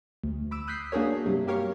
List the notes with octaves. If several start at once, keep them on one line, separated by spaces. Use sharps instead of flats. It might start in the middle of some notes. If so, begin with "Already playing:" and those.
D2
B5 D6 E6
D#6 F#6 G6 B6 C7
A#3 D4 F#4 G#4 A#4 C#5
G2 C3 F#3
A#3 G4 A#4 C#5 F5 C#6